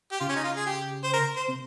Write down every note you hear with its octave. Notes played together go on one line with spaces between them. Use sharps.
G4
C#3 F4
C#4
D#4
F4
G#4
G4
C5
A#4
C5
C3